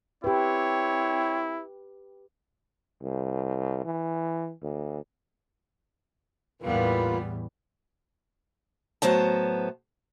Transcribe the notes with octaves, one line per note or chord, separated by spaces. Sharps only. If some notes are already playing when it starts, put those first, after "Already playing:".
C4 E4 G4 B4 C#5
C2
E3
D2
E2 A2 E3 G3 A#3 B3 F4 B4
A2 F#3 B3 C5 A5